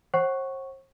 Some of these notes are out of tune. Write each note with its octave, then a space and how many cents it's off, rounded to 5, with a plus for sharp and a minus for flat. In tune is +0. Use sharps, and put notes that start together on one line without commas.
C5 +45 F#5 +20 C#6 +0